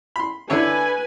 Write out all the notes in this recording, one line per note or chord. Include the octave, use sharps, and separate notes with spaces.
B5 C6
D3 E4 B4 C#5 G#5